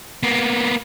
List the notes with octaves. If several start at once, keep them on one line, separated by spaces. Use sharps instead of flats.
A#3 B3